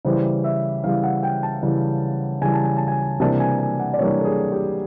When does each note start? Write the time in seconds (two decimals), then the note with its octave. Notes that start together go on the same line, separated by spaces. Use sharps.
0.05 C#3 E3 G3 C5
0.44 E5
0.84 C#3 E3 G3 F5
1.04 F#5
1.23 G5
1.43 A5
1.63 C#3 E3 G3
2.41 C#3 E3 G3 G#5
2.54 A5
2.65 G#5
2.77 A5
2.88 G#5
3.20 C3 E3 G3 A#3 D4 A5
3.40 G#5
3.59 G#5
3.80 F#5
3.94 D5
3.99 C3 E3 G3 A#3 D4 C#5
4.19 A4
4.25 G#4
4.52 G4